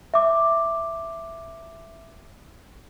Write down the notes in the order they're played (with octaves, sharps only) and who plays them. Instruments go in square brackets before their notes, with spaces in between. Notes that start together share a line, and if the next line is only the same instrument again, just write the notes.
[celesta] E5 D6